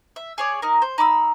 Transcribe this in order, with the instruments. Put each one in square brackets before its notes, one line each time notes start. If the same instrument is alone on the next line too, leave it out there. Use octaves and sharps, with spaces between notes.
[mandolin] E5
G#4 C#5 D5
D#4 A#4
C5
D#4 B5 D6 E6